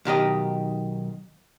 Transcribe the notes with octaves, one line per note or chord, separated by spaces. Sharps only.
B1 D#3 G4 D#5